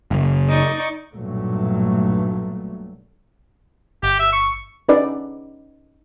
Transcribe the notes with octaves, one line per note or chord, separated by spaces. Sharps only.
F#1
D#4 D5 C#6
B1 G2 A#2 F#3 A3
G1 G4
E5
C#6
C#4 D#4 B4 D5